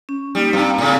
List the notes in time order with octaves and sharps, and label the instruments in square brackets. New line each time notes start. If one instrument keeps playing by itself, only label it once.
[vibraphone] C#4
[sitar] G3 [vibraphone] A#3 D#4 G4
[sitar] G2 [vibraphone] C4 F5 A#5
[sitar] A2 C#3